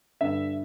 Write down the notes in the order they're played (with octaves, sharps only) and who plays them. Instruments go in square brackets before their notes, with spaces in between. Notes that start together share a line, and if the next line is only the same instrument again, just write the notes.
[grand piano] G2 D3 E5